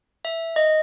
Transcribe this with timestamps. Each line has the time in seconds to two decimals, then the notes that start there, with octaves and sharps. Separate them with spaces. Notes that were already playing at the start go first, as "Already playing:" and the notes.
0.25 E5
0.56 D#5